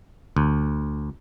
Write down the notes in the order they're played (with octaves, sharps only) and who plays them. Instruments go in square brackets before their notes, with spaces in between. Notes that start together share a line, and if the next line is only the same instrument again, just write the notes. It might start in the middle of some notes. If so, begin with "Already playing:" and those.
[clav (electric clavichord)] D2